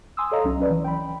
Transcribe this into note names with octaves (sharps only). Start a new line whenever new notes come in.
G#5 C6 D#6 E6
A4 C#5 D#5 F5 A#5
C2 F#3 C#4
F#3 C#4 B4 D5
E3
G5 B5